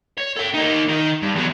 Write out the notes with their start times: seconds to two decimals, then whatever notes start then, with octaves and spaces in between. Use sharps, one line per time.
0.18 C#5
0.37 A4 G5
0.54 A#3 D#4
0.89 D#3 D#4
1.23 G2
1.36 E2 F#3